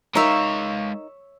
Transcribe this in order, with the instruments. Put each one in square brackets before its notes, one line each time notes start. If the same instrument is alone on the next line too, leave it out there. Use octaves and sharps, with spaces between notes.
[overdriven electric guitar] G#3 F5 [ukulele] D#4 A#4 [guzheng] C#5 E5